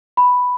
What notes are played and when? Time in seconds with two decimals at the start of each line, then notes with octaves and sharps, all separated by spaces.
0.17 B5